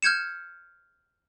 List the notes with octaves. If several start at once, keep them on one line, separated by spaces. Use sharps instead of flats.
F6 G6 G#6 C#7 E7